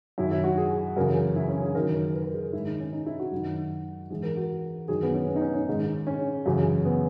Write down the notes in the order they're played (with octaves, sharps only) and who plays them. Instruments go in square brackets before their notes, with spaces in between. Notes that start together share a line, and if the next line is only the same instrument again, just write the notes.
[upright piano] F#2 D#3 E4
E4
F#4
G#4
F#2 C#3 E3 A#4
E4
C#4
G#4
F#2 D#3 A#4
B4
A#4
G#4
G#2 D#3 E4
D#4
C#4
D#4
E4
F#4
F#2 D#3
G#2 E3 G#4
A#4
F#4
F#2 D#3 G#4
B3
C#4
B3
D#4
C#4
D#4
G#2 D#3
C#4
F#2 C#3 E3
B3